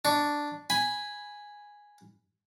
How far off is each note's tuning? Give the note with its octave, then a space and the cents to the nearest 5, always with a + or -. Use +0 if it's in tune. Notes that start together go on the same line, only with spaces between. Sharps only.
D4 +0 C#6 +20
G#5 -5 B5 +0